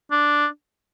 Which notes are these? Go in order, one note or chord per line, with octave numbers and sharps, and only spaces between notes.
D4